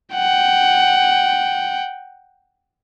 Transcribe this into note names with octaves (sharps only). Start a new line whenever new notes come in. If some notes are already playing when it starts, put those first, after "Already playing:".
F#5 G5